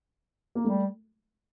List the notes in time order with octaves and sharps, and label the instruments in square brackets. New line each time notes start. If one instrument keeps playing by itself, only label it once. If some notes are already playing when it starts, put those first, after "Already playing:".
[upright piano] A#3
[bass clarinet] G3 [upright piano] A3